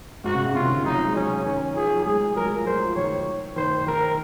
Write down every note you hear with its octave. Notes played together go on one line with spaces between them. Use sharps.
G#2 F#4
C#3
C#3
C3 F4
C#3
D#3
C#3
F#3 D#4
F3
G#3
F#3 C#4
D#3 C#4
F3 G#4
F3
F#3
G#3 G#4
F#3 A#4
G#3
F#3
F3
G#3 C5
F#3
F3
D#3 C#5
D#3 C5
D#3 A#4